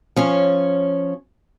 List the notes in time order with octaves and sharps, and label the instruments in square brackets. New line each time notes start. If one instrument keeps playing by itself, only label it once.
[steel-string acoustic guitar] F3 C#4 C#5